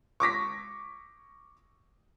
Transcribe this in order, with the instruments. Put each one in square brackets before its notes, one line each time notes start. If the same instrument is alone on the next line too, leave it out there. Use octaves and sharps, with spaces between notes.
[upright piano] C#6 D6 A#6 B6